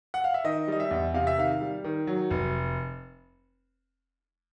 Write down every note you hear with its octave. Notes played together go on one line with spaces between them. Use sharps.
F#5
F5
E5
D#3 D#5
G3 D#5
E5
E2
C3 F5
E5
D#3 F5
G3
D#3
F#3
F1